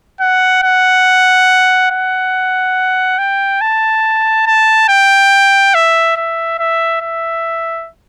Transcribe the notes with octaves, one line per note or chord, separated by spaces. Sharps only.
F#5
F#5
F#5
G5
A5
A5
G5
E5
E5
E5
E5